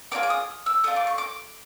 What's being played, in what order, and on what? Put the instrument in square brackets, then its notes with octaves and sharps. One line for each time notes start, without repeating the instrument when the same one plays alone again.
[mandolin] B3 D4 F4 G#4 D6
D6
D#6
E6
A3 D4 F4 D#6
D6
C#6
D6